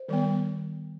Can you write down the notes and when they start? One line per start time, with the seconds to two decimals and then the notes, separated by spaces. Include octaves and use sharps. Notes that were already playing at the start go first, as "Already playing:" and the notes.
Already playing: C5
0.08 D#3 G3 B3